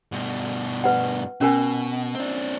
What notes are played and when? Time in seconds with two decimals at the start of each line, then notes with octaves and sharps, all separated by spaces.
0.12 G2 B2
0.84 B4 F#5
1.41 B2 C#4 A#4 G#5
2.15 C4 D4